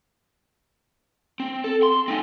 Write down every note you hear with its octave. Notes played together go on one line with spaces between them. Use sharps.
C4
A4
C6
C4 D#4